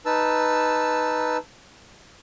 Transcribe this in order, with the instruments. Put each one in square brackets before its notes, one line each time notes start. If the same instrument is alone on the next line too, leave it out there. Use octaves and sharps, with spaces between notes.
[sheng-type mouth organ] D#4 B4 A5 E6